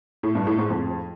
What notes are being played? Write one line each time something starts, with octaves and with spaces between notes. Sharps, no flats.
A2
G2
A2
G#2
F2